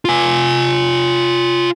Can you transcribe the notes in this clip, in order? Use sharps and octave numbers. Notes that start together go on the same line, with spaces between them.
F4 G#5